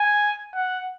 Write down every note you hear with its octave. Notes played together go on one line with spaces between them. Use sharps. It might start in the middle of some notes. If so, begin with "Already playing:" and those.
Already playing: G#5
F#5